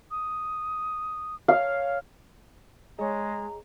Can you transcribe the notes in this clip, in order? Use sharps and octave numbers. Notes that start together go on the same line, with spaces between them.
D#6
C#5 F5
G#3 G#4 C#5 D#5 A#5